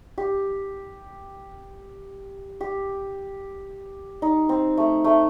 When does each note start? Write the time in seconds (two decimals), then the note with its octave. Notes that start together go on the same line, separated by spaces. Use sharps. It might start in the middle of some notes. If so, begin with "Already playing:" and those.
0.18 G4
2.61 G4
4.22 D#4
4.49 C4
4.77 A3
5.04 A3